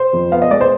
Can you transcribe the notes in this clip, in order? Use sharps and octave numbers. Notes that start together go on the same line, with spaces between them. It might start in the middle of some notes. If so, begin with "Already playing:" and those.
Already playing: C5
F2
B3 F5
D#5
G#3 D5
C5